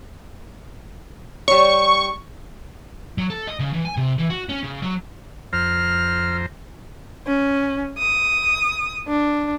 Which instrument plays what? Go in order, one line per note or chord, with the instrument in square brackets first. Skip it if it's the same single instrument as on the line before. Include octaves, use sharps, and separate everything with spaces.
[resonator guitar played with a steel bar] G3 C#5 [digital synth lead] C#6
[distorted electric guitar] F#3
A4
D#5
C#3
E3
G#5
C3
E3
F#4
C#4
C#3
F#3
[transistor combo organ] F2 C5 A#5 [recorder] F6
[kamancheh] C#4
D#6
D4